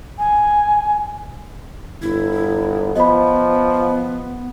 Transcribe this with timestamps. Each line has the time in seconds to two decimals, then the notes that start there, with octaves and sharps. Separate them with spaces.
0.19 G#5
2.02 G1 E4
2.96 F3 B3 D#5 B5